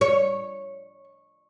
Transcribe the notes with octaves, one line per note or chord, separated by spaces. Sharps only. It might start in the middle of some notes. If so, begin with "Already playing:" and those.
C#5